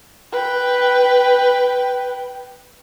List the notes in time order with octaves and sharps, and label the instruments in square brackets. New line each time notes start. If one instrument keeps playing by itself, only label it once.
[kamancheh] B4 G5